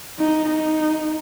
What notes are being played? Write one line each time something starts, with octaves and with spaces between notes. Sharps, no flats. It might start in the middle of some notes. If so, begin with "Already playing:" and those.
D#4
D#4